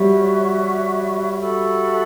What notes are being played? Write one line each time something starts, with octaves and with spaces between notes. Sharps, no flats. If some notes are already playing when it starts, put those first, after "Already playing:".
Already playing: G3 F#4 C#5 E5
F#4 A4 E5 B5